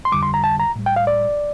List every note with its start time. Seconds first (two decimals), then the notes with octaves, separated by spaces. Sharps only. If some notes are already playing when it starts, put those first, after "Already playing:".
0.05 C6
0.12 F2 D3 G3 D6
0.23 C6
0.34 A#5
0.44 A5
0.60 A#5
0.76 A2 G3
0.86 G5
0.96 F5
1.07 D5